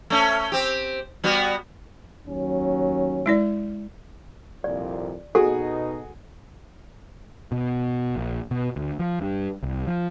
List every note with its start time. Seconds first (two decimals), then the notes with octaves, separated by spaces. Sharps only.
0.10 A3 C#4
0.52 C4 G4
1.24 G3 B3 F#4
2.27 D#2 F#3 C#4
3.26 G#3 E4 D5
4.64 C2 F2 A#2 D5
5.35 B2 D#4 F#4 G#4 A4
7.52 B2
8.16 A#1
8.51 B2
8.76 D2
8.99 F3
9.21 G2
9.63 C2
9.87 F3